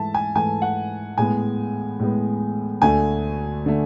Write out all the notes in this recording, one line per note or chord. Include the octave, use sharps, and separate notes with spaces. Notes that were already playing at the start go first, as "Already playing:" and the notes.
Already playing: G#2 E3 A3 E5 A5
G#5
G#2 E3 A3 G#5
F#5
A2 G#3 B3 G#5
A2 G#3 B3
D2 D3 A3 G#5
D3 A3